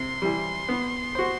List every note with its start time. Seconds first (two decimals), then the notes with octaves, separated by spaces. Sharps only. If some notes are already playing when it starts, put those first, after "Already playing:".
Already playing: C3 C6
0.22 E3 G3
0.68 B3
1.15 F#4 C5